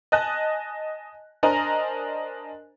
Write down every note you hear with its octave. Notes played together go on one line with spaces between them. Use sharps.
D#5 G#5 A5 F#6 A#6
D4 A#4 C5 D#5 G#5 A#5